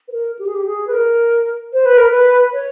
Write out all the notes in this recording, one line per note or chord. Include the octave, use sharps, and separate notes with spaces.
B4
A#4
G4
G#4
G4
G#4
B4
A#4
C5
B4
A#4
B4
C#5